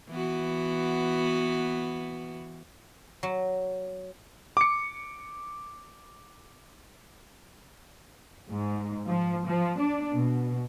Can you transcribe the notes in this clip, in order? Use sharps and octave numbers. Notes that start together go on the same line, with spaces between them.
E3 B3 F#4
F#3
D6 C#7
G#2
F3
F3
D4
B2